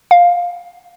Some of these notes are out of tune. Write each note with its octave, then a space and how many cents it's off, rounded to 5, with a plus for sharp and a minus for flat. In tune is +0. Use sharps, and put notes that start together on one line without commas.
F5 +10